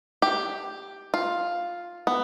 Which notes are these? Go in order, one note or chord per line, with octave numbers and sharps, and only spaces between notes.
G4
F4
B3